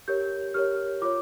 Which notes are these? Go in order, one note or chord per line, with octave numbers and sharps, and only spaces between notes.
G4 A#4 C#5 G6
G4 A#4 C#5 F6
F4 C#5 D6